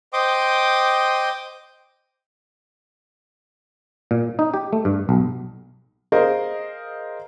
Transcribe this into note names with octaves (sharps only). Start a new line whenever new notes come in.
C5 D#5 G5 C6 D6 D#6
A#2
D#4
G4
A3
G2
B1
G#4 A#4 C5 D#5 F5